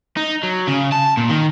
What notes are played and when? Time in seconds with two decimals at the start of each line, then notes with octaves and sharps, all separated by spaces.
0.17 D#4
0.43 F#3
0.67 C#3
0.92 A5
1.17 A#2
1.29 D#3